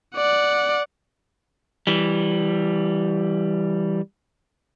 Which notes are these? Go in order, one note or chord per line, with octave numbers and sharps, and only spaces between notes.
D5 F#5
E3 G3